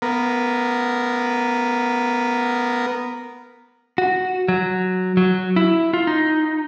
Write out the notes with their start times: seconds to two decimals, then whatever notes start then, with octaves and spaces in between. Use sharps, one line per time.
0.02 B3 A#4
3.98 F#4
4.48 F#3
5.17 F#3
5.56 E4
5.93 F4
6.07 D#4